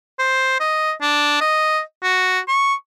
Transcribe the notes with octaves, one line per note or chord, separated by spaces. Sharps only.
C5
D#5
D4
D#5
F#4
C#6